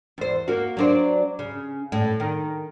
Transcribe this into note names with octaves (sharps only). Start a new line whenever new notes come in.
E2 C5
A#3 F#4
F#3 D4 C5
C#3
A2
D#3